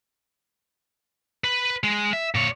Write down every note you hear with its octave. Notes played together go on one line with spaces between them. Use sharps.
B4 B5
G#3
E5
A#2 C#5